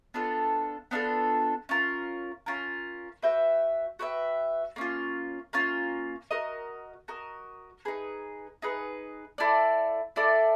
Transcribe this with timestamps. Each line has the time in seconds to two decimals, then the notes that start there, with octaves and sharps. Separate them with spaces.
0.14 B3 D4 F4 A4
0.91 B3 D4 F4 A4
1.69 C#4 F4 A#4
2.46 C#4 F4 A#4
3.23 F#4 B4 E5 G5
3.99 F#4 B4 E5 G5
4.76 A#3 C#4 F4
5.53 A#3 C#4 F4
6.31 F#4 A#4 D#5
7.08 F#4 A#4 D#5
7.85 D#4 G#4 B4
8.62 D#4 G#4 B4
9.38 E4 A4 D5
10.16 E4 A4 D5